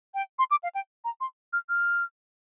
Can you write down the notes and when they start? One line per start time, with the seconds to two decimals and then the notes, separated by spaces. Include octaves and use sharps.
0.14 G5
0.39 C6
0.51 D6
0.63 F5
0.75 G5
1.04 A#5
1.20 C6
1.53 F6
1.69 F6